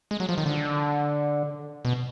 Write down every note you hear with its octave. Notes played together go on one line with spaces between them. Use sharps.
G#3
F#3
F3
D#3
D3
B2